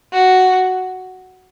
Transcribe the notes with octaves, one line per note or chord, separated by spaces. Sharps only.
F#4